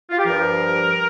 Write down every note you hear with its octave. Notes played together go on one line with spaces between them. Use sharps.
F4
G4
G2 F3 A#4